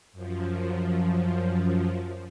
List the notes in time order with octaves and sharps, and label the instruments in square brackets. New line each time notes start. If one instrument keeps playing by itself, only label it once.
[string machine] F#2 F3